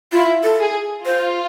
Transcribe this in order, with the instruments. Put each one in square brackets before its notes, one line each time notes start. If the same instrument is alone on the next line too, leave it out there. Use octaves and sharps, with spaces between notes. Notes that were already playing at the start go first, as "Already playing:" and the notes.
[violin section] E4 [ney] F4
[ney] A4
[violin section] G#4
[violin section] F4 [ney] C5